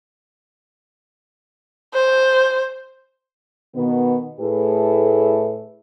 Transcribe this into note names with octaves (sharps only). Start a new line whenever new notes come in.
C5
B2 D#3 B3
A2 A3 E4 G#4 A4 B4